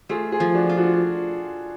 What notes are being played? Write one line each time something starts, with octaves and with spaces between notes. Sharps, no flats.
A3 F4 G#4
F4 G#4
F3
D4 F#4
F4
D4 F#4